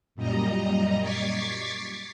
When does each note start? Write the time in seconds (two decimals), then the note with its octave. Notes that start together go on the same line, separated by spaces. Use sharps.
0.15 F#2 A#2 G3 D#5 A#5
1.01 C#6 D6 G#6 A6 B6 C7